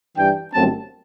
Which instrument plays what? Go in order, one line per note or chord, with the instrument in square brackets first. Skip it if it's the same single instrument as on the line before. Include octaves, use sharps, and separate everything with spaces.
[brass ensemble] G2 E3 G3 D4 G5
G1 F#2 F#3 A3 C4 A5